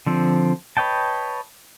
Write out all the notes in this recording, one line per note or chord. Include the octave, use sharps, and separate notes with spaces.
D3 F3 C4
B4 C#5 D#5 G5 A5